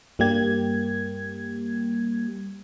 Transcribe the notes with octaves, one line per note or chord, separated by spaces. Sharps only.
G2 G3 A#3 G4 G#6